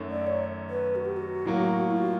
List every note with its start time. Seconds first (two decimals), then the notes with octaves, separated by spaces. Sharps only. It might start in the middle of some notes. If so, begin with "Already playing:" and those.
Already playing: F#2 D#3 F#3 A3 C#4
0.10 D5
0.27 C#5
0.70 B4
0.95 F#4
1.05 G4
1.16 F#4
1.45 A2 F#3 A#3
1.91 E4
1.96 F4